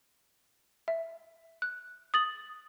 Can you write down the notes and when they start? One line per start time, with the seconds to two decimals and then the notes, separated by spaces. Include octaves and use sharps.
0.88 E5
1.62 F#6
2.14 D#6 A6 F#7